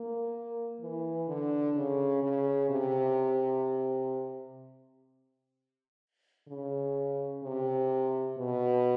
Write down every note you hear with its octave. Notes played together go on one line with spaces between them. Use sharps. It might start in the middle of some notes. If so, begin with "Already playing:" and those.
Already playing: A#3
E3
D3
C#3
C#3
C3
C#3
C3
B2